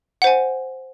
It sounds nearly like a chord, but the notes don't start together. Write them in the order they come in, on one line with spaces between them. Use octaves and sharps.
F#5 C5 G#5